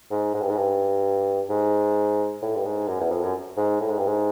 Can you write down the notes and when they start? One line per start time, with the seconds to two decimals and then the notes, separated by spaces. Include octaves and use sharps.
0.11 G#2
0.34 G#2
0.41 G2
0.49 G#2
0.57 G2
1.50 G#2
2.42 A2
2.55 G2
2.65 G#2
2.88 F#2
3.00 E2
3.11 F2
3.22 F#2
3.57 G#2
3.81 A2
3.89 G#2
3.98 G2
4.07 G#2